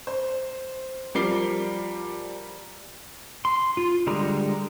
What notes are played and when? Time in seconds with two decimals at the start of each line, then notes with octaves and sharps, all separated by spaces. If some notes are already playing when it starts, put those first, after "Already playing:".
0.07 C5
1.15 F3 G3 A#4 D6 C7 G7
3.45 C6
3.77 F4
4.07 D3 G3 G#3 A#5